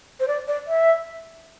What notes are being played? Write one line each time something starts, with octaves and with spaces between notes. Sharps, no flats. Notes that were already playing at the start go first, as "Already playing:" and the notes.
C5
D5
D5
E5